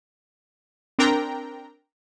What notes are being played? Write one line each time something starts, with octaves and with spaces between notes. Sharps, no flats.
C4 D4 A#4 G5 A#5